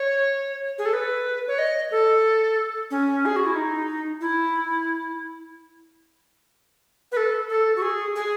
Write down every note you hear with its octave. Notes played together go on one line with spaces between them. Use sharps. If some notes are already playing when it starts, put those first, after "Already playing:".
Already playing: C#5
G#4
A4
B4
C#5
D#5
A4
C#4
G#4
F#4
E4
D#4
E4
B4
A4
A4
F#4
G#4
G#4